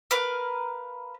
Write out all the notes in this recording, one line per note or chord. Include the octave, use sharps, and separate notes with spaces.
A#4 B4 F5